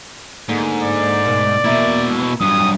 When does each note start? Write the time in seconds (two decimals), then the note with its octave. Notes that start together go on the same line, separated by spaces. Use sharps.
0.49 G#2 D3 A#3
0.83 D5
1.25 D2 B2 A#3
1.64 B2 A#3 E4 E5
2.41 G2 F#3 D#6